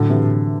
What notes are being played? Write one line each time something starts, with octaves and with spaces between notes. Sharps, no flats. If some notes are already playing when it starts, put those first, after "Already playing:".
Already playing: A2 D3 F#3
C3 E3